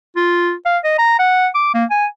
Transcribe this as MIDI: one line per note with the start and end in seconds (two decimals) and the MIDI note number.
0.16 0.54 65
0.65 0.78 77
0.84 0.94 75
0.99 1.15 82
1.19 1.48 78
1.55 1.71 86
1.74 1.85 58
1.90 2.06 80